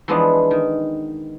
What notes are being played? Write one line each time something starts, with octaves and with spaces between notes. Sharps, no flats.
E3 F3 G#3 B3 D4
D#3